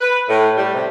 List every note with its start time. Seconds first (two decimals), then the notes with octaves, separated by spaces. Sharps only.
0.01 B4
0.28 A2
0.56 G3
0.74 C3